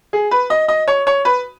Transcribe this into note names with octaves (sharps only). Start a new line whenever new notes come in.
G#4
B4
D#5
D#5
C#5
C#5
B4